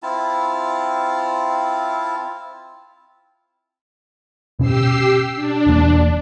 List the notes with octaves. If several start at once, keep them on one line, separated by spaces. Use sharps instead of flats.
C4 E4 F4 A5
B2 C#4 G4 E6 C7
D4
E1 A#3